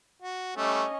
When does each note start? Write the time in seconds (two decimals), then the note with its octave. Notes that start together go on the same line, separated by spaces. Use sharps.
0.22 F#4
0.57 G3 A3 C#4 D#5